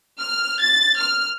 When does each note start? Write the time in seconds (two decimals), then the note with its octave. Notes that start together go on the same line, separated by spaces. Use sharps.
0.20 F6
0.61 A6
0.99 F6